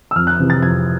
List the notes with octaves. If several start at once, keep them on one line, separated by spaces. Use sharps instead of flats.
E6
F2 F6
F#6
C3 E3
A6
F2 G#6